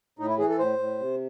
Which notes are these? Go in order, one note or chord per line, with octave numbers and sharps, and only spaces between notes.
A2 D#4
E4
E3 G#4
A4
A2 C5
A2
C3